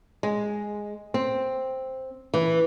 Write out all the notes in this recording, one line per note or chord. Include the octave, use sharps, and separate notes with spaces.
G#3
C4
E3